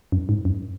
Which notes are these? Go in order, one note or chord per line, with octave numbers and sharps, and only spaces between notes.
F#2
G#2
F#2